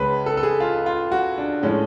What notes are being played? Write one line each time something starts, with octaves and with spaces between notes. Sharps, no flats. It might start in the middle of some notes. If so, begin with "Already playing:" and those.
Already playing: C#2 C#3 G#3 B4 C#5
A4
A4
G#4
F4
F4
F#4
D4
A2 F3 G#3 C#4